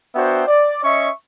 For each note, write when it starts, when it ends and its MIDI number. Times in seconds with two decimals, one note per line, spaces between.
0.15 0.43 59
0.15 0.43 62
0.15 0.43 66
0.15 0.43 72
0.15 0.43 76
0.15 0.43 79
0.47 0.83 74
0.84 1.11 61
0.84 1.11 75
0.84 1.11 76
0.84 1.11 85